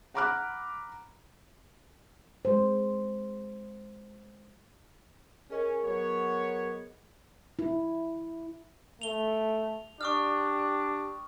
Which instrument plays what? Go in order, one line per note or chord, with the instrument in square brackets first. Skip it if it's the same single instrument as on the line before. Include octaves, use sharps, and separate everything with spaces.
[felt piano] F#5 A#5 B5 D6 F6 F#6
[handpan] G#3 C5
[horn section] C#4 [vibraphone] G#4 A#4 D#5
[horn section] F#3 B3 C#5
[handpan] E4
[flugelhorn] A3 [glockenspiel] F7 G7
[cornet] D4 [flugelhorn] G4 [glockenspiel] C#6 D#6 F6